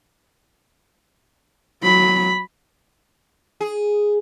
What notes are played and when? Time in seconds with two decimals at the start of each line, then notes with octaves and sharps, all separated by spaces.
1.83 F#3 B5
3.61 G#4